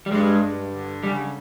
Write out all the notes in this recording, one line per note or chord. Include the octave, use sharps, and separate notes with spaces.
G3
G2 G#3
G2
D3
C#3 G3